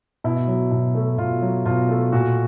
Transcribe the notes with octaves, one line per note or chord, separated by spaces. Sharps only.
B2 E4
F#3
B2
A3
B2 F4
F#3
B2 F4
A3
A#2 F#4